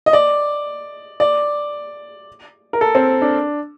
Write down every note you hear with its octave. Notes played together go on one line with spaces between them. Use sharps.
D#5
D5
D5
A#4
A4
C4
D4